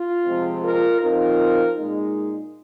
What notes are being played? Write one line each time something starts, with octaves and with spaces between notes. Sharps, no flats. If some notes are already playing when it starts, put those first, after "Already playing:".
Already playing: F4
C3 F3 G#3 C4
F4 A#4
F3 C4 D#4 F4 A#4
A#2 G#3 D#4